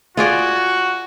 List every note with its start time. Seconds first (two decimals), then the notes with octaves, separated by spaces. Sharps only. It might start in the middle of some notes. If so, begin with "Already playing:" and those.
0.17 F4 F#4 G#4 D5